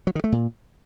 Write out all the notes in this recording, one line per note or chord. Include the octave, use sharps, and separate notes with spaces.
F#3
D#3
A3
A#2